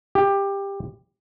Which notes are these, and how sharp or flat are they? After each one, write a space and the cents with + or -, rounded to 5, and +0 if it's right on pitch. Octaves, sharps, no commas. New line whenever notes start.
G4 +15